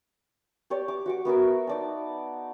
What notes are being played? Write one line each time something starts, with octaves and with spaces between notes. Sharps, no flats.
G4 C#5 D5
D6
F#4 C#6 D6
B3 F#4 A#4 E5
D#4 D5 A5